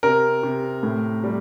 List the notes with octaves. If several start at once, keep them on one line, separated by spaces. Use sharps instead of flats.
C3 A#4
C3
A2
G3